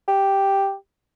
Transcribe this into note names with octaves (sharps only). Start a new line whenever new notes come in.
G4